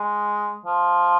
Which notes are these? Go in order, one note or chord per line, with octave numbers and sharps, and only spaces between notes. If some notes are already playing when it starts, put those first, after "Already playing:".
Already playing: G#3
F3